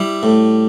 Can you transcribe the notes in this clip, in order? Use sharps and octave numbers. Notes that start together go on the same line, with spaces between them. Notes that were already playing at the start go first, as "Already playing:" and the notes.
Already playing: G3 E4
A2